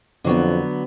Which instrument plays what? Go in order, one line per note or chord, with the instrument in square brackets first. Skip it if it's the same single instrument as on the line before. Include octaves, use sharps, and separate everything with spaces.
[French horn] F2 [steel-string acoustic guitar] D3 F#3 B3